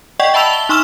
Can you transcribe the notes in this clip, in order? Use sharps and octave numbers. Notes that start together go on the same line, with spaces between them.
D5 D#5 F#5 G5 C#6
E5 A5 B5 E6 F7
G7
D#4 C6 C#6 E6 F6 E7